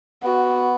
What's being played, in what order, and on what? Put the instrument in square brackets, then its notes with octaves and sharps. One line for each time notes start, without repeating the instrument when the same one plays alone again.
[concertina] B3 [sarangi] F#4